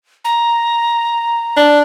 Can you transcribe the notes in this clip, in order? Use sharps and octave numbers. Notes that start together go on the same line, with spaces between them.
A#5
D4